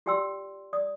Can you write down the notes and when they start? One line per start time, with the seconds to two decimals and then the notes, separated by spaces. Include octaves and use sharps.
0.06 F4 G4 D5 G5 C6 E6
0.73 D5 D#6